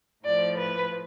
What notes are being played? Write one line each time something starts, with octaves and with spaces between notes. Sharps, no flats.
A2 F3 D5
B4